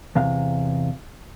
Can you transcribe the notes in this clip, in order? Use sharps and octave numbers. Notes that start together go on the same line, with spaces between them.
E2 C3 F5